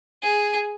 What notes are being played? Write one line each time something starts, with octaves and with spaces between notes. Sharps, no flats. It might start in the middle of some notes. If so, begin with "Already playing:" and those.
G#4